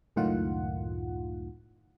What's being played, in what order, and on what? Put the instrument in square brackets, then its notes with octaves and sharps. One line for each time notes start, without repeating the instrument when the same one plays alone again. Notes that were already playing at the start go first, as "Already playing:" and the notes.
[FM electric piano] C#2 F#2 A2 D#3 F4 F#5